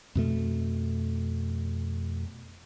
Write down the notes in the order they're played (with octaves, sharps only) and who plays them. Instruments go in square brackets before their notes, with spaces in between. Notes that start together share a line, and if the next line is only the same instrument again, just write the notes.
[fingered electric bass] F2 B2 A3